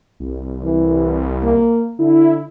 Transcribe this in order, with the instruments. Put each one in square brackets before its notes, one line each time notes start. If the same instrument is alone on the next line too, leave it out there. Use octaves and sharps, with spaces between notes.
[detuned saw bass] C2
[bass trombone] E3
A#3
[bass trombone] D3 [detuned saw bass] E4